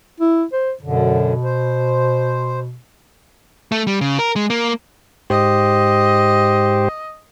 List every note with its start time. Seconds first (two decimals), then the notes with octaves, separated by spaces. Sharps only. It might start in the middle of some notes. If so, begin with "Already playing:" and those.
0.20 E4
0.53 C5
0.82 F#2 B2 D3
1.44 C5
3.72 A3
3.87 G3
4.01 C#3
4.19 A#4
4.36 G#3
4.50 A#3
5.30 G#2 G4 C5 D#5